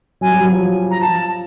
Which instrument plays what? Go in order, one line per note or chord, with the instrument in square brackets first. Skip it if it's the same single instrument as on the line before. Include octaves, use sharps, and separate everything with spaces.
[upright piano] F#3 [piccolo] G#5
[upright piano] G3
F#3
F3
[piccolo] A#5
[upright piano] F3 [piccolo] A5